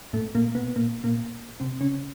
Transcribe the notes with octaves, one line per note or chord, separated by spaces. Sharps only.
A2 A3
A#2 A#3
B2 B3
A#2 A#3
A#2 A#3
C3 C4
C#3 C#4